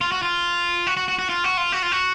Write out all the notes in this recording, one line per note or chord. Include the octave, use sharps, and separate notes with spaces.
F4
F#4
F4
F#4
F#4
F#4
F#4
F4
F#4
F4
F#4
F4
F#4